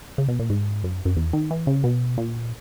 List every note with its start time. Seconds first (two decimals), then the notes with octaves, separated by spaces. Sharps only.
0.18 C#3
0.28 B2
0.39 A#2
0.50 G#2
0.84 F#2
1.05 F#2
1.17 E2
1.33 D#3
1.51 E3
1.67 C#3
1.84 B2
2.17 A#2